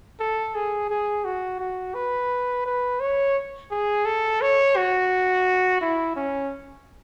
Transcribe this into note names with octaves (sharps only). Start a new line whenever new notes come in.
A4
G#4
G#4
F#4
F#4
B4
B4
C#5
G#4
A4
C#5
F#4
E4
C#4